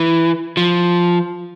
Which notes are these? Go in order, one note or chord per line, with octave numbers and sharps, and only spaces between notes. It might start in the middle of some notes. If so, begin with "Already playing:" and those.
Already playing: E3
F3